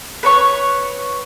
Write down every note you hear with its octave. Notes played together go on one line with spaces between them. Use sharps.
B4 C#5 C#6